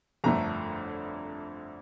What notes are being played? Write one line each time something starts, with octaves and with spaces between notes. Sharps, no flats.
G1 F2 D3 A3 A#5